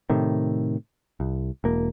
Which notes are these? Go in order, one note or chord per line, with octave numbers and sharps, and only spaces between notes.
A2 C3 D#3
C2
E1 A#3